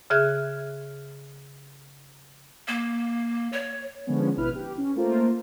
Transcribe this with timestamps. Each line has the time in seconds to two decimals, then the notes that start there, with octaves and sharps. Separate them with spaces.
0.10 C#3 G#4 E5 F6 F#6 G#6
2.68 A#3
3.53 C#5
4.06 D3 F3 G#3 B3 C#4
4.37 G#1 B2 E4 B4 F6
4.55 G4
4.78 C#4
4.95 A3 A#3 F4 A#4 C5